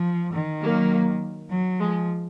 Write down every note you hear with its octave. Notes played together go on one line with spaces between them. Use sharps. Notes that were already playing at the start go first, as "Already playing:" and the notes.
Already playing: F3
D#3
F#3 A#3
F#3
F3 G#3